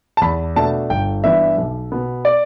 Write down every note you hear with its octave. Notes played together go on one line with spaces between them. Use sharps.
A5
E2 B5
B2 A3 D4 A5
G1 G5
G2 E3 B3 D4 E5
B1
B2 B3
D5